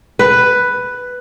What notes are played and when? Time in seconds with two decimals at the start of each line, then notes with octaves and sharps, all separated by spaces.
0.19 B4